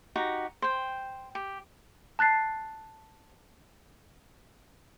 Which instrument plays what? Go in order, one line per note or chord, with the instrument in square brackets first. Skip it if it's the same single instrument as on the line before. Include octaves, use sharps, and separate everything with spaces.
[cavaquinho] D#4 F#4 G4 A#5
C5 G5
G4
[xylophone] A5 F#6 A6 C7